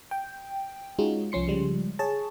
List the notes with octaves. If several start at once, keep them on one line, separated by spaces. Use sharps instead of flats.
G5
G#3 C#4 D#4 F4 F#4
C2 F3 C#4 C6 C#7
C#3 F3 G3 G#3
G#4 C#5 A5